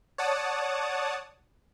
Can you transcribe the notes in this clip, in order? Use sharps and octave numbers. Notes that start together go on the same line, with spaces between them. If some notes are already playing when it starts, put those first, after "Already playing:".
C#5 D5 F#5 A5 D#6